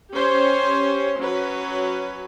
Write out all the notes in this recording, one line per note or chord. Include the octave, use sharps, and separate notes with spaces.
C#4 G4 C5 C#5
F#3 C#4 B4